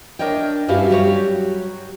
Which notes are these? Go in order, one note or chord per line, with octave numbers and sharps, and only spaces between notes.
D4 A#4 C#5 D#5 G5
G2 C#4 E4 F#4 G4 F5
F#3 G3 F#4 G4 A4 C#5